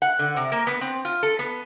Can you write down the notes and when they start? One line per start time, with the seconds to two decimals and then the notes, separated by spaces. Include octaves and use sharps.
0.02 F#5
0.19 D3
0.36 C3
0.52 A#3
0.67 B3
0.81 C4
1.05 F4
1.23 A4
1.39 B3